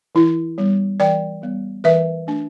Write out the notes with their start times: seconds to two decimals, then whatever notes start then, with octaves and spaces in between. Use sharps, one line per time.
0.15 E3 E4
0.58 G3 B3
1.00 E3 D5 G5
1.42 G3 B3
1.84 E3 B4 E5
2.27 A3 D4